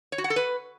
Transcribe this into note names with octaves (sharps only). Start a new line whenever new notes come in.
C#5
F#4
F#5
A4
B4